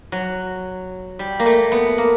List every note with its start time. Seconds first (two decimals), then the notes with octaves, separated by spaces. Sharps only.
0.12 F#3
1.19 G3
1.39 A#3
1.46 A3
1.72 B3
1.98 A#3